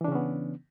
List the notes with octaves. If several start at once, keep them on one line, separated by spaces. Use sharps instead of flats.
C#3 E3 B3 C#4 D4